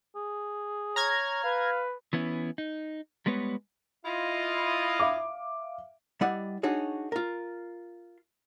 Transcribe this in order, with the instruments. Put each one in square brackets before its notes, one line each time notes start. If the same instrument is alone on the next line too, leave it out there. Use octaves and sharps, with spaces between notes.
[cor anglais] G#4
[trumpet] C#5 [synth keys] A#5 F6 G#6
[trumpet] B4 [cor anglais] F5
[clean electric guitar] E3 B3 C#4 E4
D#4
G3 G#3 B3 B4 C#5
[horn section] E4 F4 D#5
[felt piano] E5 F5 D6
[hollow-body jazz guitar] G3 E4 D5 D#5 F#5
D4 D#4 F#4 G#4 C#5
F4 A#4